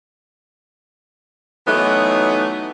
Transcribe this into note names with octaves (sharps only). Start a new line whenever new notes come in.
E3 F#3 A3 B3 D#4